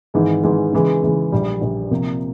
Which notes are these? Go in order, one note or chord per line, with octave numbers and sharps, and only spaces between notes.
G#1 G#2 E3 G#3
G#1 G#2 E3 G#3
C#3 E3 G#3
C#3 E3 G#3
A#1 A#2 G3
A#1 A#2 G3
C3 F3 A#3